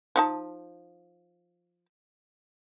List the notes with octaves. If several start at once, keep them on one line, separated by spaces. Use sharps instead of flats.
F3 D#4 A5